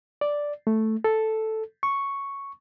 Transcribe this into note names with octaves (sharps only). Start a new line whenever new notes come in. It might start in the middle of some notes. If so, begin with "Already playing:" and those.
D5
A3
A4
C#6